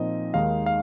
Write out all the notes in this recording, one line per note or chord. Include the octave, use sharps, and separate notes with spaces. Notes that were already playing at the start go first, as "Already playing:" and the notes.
Already playing: A#2 F3 C4 D#4 D#5
D#2 D#3 G#3 D#4 F5
F5